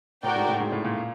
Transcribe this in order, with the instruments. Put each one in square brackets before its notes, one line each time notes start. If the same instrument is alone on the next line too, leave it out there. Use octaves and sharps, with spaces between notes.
[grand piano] A2 [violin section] F#4 A#4 D5 G5
[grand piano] G#2
A2
G#2
A2
A#2